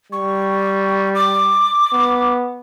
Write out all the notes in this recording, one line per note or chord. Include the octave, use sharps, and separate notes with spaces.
G3 C#6
D6
B3